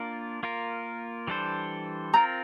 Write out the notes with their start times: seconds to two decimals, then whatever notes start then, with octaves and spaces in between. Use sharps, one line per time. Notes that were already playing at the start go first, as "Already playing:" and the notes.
Already playing: A#3 D4 F4 A#4
0.43 A#3 F4 A#4
1.27 E3 G3 D4 A4 C5
2.14 C4 F4 A#4 A#5